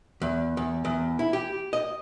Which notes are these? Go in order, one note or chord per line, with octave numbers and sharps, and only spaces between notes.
E2
E2
E2
E4
G4
D#5